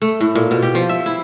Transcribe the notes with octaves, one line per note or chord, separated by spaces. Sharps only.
A3
A2
A#2
B2
G4
F3
E5
E4